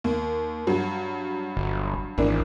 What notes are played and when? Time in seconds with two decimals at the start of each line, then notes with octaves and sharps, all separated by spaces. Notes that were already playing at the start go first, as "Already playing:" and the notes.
0.04 D#2
0.67 G2 F#3
1.57 G1
2.18 G#1 E3 A#3 D4